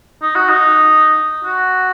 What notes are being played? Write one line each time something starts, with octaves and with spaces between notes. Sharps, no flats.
D#4
F#4
D#4
F#4